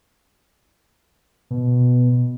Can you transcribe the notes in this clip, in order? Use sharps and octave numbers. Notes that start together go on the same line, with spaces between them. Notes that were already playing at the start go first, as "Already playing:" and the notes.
B2